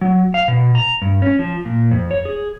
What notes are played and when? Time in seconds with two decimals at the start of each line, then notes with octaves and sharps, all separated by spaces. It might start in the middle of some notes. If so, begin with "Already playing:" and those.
0.01 F#3
0.34 F5
0.48 B2
0.75 A#5
1.02 G2
1.22 C#4
1.39 F3
1.65 A#2
1.91 F2
2.11 C#5
2.25 G#4